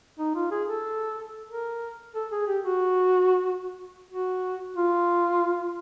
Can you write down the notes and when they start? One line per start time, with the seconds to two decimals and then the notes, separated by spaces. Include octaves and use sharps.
0.19 D#4
0.35 F4
0.51 G#4
0.68 A4
1.50 A#4
2.15 A4
2.32 G#4
2.47 G4
2.64 F#4
4.11 F#4
4.77 F4